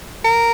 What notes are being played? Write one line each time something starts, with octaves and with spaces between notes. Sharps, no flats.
A#4